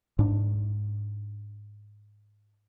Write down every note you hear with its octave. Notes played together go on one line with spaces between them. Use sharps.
G#2 D4